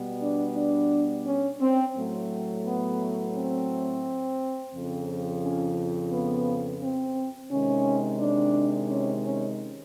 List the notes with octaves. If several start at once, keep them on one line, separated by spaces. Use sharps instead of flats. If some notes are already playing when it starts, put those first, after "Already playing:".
Already playing: B2 G3 B3
D4
D4
C#4
C4
A2 F#3 A3
B3
C4
F2 C#3 F3
C#4
B3
C4
C3 D#3 G#3 C#4
D4
C#4
C#4